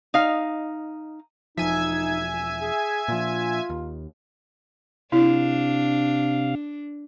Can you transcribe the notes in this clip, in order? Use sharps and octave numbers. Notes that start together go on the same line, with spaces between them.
D#4 F5
E1 F3 D#4 E5 G#5 G#6
G#4
A#2 F3 F4
D#2
C3 D4 E4 F5